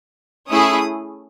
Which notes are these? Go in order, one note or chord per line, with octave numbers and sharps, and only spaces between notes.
A3 C#4 E4 G#4 D#6